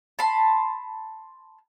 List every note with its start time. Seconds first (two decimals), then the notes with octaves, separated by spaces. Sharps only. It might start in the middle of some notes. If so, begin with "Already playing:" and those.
0.19 A5 B5 C6